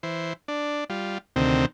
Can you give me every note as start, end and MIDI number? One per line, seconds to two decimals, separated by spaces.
0.03 0.33 52
0.03 0.33 72
0.48 0.84 62
0.90 1.18 55
0.90 1.18 65
1.36 1.66 38
1.36 1.66 48
1.36 1.66 51
1.36 1.66 60